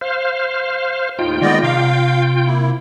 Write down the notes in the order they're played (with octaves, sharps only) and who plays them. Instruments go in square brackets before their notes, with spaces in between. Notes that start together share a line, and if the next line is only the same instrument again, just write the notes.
[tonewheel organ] C5 F5
[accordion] D#2 A2 [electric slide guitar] D#4 [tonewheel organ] F4 G5
[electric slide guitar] D#3 G#3 A#3 [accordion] B3 D5 D#5
[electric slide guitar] C3 A#5 [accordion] F5
[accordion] A#3 E4